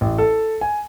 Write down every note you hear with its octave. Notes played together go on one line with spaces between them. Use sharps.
A1
A4
G#5